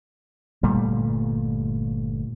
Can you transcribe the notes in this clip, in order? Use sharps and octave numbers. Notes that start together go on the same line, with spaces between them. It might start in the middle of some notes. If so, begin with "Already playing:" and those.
G1 A#2 G3 A3